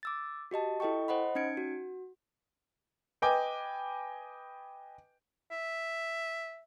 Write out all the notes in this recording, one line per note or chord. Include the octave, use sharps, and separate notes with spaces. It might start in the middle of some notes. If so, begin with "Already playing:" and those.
D6 E6 A6
F#4 G4 D#5 A5
E4 A4 D#5 G5 C#6
C5 D#5 F#5 B5
C#4 D#4 G#6 C#7 D7
F#4
B4 D#5 G5 G#5 D6
E5